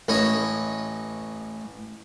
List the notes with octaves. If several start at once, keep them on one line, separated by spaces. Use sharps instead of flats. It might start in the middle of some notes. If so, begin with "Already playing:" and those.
A1 E4 C#5 D#5